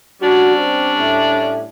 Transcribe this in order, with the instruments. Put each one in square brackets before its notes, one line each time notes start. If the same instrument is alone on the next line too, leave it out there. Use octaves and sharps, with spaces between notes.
[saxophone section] G3 C#4 D4 [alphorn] F#4
[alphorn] C4
A2